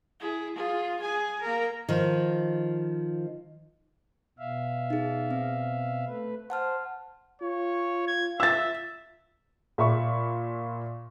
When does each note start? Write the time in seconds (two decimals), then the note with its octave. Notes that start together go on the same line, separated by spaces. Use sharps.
0.20 E4 G#4
0.55 F4 G#4
1.00 G#4 G#5
1.41 A#3 A#4
1.89 D#3 F3
4.38 B2 E5 F5
4.90 D#4 G#4
5.31 C4
6.08 A3 B4
6.50 C5 F#5 A5 F6
7.42 F4 C#5
8.07 G#6
8.40 E5 E6 A6
9.78 A#2 E5 B5 C#6